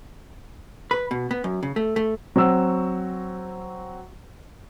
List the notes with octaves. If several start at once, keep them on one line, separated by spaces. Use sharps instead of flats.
B4
B2
B3
F#2
C#3
A3
A3
F#3 C4 F#4 E6